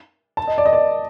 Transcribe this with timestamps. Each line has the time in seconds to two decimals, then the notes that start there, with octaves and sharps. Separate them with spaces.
0.37 A5
0.48 D#5
0.58 D5
0.66 D#5
0.73 D5